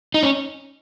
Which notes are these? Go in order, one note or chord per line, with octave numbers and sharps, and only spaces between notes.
D#4
C#4